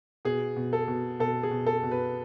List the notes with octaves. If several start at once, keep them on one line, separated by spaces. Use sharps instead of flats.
B2 G#4
B2
A4
B2
B2 A4
G#4
B2
A4
B2
B4